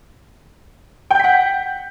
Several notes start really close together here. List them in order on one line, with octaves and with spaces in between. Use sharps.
G5 G6 B6 F#5